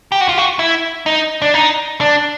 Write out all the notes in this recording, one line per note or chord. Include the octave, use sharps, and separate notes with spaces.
G4
F#4
F4
F#4
E4
D#4
D4
D#4
D4